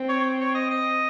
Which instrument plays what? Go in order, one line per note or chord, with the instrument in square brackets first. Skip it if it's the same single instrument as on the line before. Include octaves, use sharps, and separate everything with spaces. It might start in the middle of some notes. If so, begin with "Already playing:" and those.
Already playing: [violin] C4
[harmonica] C#5
C#5
D#5
D#5